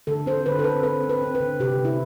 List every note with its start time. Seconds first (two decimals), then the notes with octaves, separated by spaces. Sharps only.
0.07 D3 A4
0.26 C4 C5
0.46 D3 B4
0.59 A4
0.64 C4 B4
0.83 C4 B4
1.03 C4
1.09 B4
1.22 C4
1.35 B4
1.41 D3
1.60 C3 G4
1.79 C4
1.85 E4